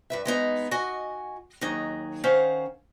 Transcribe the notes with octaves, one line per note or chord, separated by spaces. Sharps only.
G2 B4 E5
G#3 B3 D#4
F#4 D#5 F#5 G#5
D#2 F#3 D#4 G#4
D#3 C#4 C5 F5 F#5